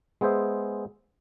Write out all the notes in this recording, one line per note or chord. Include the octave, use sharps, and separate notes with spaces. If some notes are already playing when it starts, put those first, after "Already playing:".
G#3 B3 G#4 C5 E5